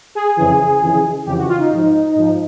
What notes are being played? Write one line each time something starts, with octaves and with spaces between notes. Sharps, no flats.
G#4
F2 C#3 E3 G#4
F2 C#3 E3
F2 C#3 E3 G4
F#4
F4
D#4
G#2 F3
G#2 F3